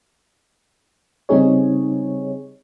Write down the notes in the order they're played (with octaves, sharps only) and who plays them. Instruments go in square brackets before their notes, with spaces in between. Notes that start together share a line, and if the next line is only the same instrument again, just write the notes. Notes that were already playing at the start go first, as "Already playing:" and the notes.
[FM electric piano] C#3 G3 C4 D#4 G#4 C#5